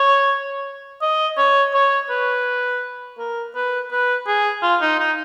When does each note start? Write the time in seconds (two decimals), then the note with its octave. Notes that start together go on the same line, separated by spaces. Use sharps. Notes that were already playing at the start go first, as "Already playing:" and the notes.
Already playing: C#5
1.02 D#5
1.37 C#5
1.74 C#5
2.10 B4
3.18 A#4
3.55 B4
3.91 B4
4.27 G#4
4.63 F4
4.81 D#4
4.99 D#4